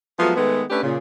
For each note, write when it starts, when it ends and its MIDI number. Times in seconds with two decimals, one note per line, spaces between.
0.19 0.32 53
0.19 0.32 54
0.19 0.32 56
0.19 0.32 57
0.19 0.32 59
0.19 0.32 65
0.36 0.63 51
0.36 0.63 56
0.36 0.63 57
0.36 0.63 59
0.70 0.83 57
0.70 0.83 61
0.70 0.83 62
0.70 0.83 67
0.70 0.83 71
0.83 0.98 46
0.83 0.98 49